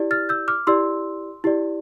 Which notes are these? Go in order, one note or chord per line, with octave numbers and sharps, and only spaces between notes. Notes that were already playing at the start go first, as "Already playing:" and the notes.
Already playing: E4 G4 D5
F6 A6
E6 G6
D6 F6
E4 G4 D5 C6 E6
E4 G4 D5